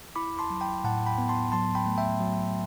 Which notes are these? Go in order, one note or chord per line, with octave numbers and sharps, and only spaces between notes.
E4 B5 D6
A5 C6
F#3
G5 B5
A2 F#5 A5
G5 B5
B3
A5 C6
F#3 A5 C6
G5 B5
A3
E5 G5
F#3